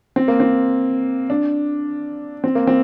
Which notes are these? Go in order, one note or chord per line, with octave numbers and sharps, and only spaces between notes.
C4
A#3
C4
D4
C4
A#3
C4